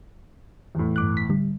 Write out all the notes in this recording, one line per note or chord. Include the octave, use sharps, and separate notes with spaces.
E2 A2
G2 D6 F#6
B6
D3 G3